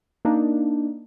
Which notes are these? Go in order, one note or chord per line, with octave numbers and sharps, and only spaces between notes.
A#3 D4 D#4